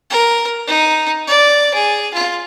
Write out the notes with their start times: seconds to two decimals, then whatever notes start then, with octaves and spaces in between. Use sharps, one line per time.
0.10 A#4
0.67 D#4
1.28 D5
1.74 G#4
2.14 F4